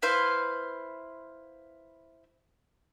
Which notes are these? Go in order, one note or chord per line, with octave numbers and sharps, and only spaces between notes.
E4 B4 C5 F5